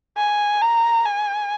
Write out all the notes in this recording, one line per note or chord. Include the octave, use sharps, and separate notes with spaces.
G#5
A#5
G#5